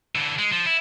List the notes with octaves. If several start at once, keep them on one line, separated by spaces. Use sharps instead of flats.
D3 E3
G#3
F3
E4